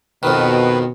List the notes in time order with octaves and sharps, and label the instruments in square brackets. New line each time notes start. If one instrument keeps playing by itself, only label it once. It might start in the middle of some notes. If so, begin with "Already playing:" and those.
[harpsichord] F2 D#3 [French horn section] B2 [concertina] B4